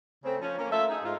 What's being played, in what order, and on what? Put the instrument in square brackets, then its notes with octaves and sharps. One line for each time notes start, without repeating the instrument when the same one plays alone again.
[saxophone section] C#3 A3 C4
F3 C#4
A#3 C#4
A3 F4 A4 E5
D#4 G#4
G#2 G#3 F4